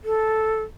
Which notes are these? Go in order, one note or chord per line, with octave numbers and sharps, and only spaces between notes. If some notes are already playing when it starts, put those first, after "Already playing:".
A4